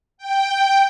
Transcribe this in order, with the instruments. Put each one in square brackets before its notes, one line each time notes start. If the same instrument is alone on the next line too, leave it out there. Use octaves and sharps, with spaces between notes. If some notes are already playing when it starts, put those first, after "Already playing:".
[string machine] G5